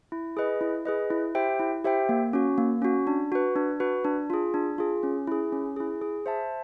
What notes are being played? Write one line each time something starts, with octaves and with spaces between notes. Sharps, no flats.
E4
G#4 B4 D#5
E4
G#4 B4 D#5
E4
G4 C5 E5 G5
E4
G4 C5 E5 G5
A#3
C#4 F#4
A#3
C#4 F#4
D4
F#4 B4
D4
F#4 B4
D4
F4 G#4
D4
F4 G#4
C#4
E4 G#4
C#4
E4 G#4
G#4
C5 E5 A5